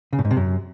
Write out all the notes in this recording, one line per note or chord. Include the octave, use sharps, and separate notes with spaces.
C#3
A2
G#2
C3
F#2